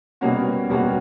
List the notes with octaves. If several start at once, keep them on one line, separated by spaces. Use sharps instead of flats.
B2 G3 A#3 C#4 F#4
B2 G3 A#3 C#4 F#4